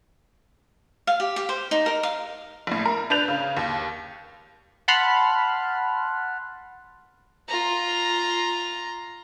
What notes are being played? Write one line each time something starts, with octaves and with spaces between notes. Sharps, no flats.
F5
G4
G4
C5
D#4
A#4
F5
A#1 A2
A#4
D4 B4 G6 F7
C#3
D#2
F#5 A5 B5 C6 F6 F#6
F4 A#5